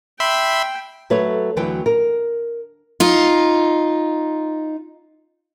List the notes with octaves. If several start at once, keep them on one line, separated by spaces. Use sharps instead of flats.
E5 G5 B5 C6
F#3 A3 B4 C#5
D2 E3 F#3 B4 G5
A#4
D#4 F4